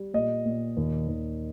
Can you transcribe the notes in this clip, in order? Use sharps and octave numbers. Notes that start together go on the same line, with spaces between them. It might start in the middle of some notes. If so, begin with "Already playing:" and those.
Already playing: G3
A#2 D#5
A#2
D#2
D#2